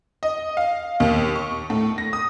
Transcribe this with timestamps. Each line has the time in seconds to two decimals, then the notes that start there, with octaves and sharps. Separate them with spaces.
0.23 D#5
0.57 F5
1.00 D#2
1.36 C#6
1.70 A2
1.98 A#6
2.13 D#6